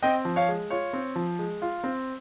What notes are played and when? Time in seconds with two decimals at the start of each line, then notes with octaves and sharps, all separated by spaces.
0.02 C4 D#5 G5
0.25 F3
0.36 C#5 F5
0.49 G#3
0.70 F4 C#5
0.93 C4
1.16 F3
1.39 G#3
1.62 F4
1.84 C4